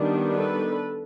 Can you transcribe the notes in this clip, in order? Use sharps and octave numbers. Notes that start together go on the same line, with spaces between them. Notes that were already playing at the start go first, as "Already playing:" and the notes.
Already playing: D#3 G3 B3 D4
A4 B4